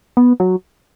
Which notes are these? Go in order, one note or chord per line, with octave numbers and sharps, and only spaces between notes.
B3
F#3